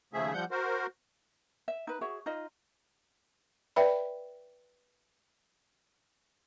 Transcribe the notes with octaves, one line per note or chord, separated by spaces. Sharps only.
D#2 C#3 F3 A3 G#4 E5
F3 G3 F#5 G6
F#4 A#4 C5
E5
D#4 B4
F#4 G#4 C#5 E5
D#4 F4 D#5
B4 D5 E5 G5 B5